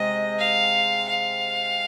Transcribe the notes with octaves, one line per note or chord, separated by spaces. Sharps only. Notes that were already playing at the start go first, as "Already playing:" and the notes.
Already playing: C3 G#3 C4 D#5
F5
F5